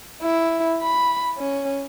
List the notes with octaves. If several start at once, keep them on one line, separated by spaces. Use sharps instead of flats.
E4
B5
C#4